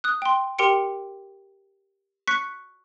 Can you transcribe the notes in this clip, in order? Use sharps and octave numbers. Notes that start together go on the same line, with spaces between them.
D#6 F#6
G5 C6
G4 A#4 G5 C6 C#7 D7
C#6 F#6 B6 C#7